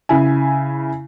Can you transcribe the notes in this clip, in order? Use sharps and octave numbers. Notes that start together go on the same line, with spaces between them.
C#3 E4 G#5